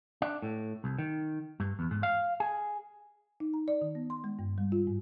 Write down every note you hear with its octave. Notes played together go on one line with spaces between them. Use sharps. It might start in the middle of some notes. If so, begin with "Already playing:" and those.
D4
A2
C2
D#3
G2
E2
G#2
F5
G#4
D#4
A#5
D5
D#3
B3
C6
G#3
G2
G3
F4
G#2